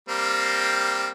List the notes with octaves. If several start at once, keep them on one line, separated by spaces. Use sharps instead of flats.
G3 A#3 C4